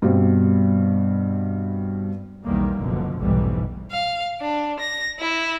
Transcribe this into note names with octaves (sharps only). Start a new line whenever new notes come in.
G2 B2 G3 C4
B1 E2 D#3 G3 A#3
F#1 B2 D3 F3
F1 B1 G#2 B2 E3 G3
F5
D4
A#6
E4